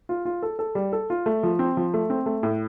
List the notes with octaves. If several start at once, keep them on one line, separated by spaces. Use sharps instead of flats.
F4
F4
A4
A4
G3
A4
F4
A3
F3
C4
F3
A3
C4
A3
A2